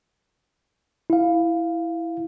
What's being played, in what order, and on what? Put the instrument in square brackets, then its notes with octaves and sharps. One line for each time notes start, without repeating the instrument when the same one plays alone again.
[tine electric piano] E4 F5